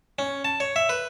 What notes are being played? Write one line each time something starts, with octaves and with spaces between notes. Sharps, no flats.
C#4
A5
C#5
E5
B4